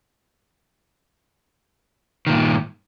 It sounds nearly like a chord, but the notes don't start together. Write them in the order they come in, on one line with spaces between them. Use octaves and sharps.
D#3 A#2 G2